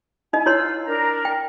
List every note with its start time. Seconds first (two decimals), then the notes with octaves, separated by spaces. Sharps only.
0.33 D#4 E4 D#5 G#5
0.46 E4 F4 C#5 C6 E6
0.86 D4 A#4 A#5
1.25 G5